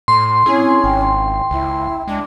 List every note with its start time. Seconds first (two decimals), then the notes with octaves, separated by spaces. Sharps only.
0.08 A2 C6
0.46 C4 C#4 E4 G#4
0.84 G#1 G5
1.51 C#2 E4
2.07 G#3 D4